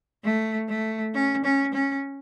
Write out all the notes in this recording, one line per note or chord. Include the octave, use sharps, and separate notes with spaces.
A3
A3
C#4
C#4
C#4